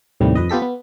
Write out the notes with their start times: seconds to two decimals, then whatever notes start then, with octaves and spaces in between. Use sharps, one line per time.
0.20 D#2 A2 C3 G3
0.35 F2 B4 D#5
0.50 B3 F4 G4 A4 B6
0.62 B3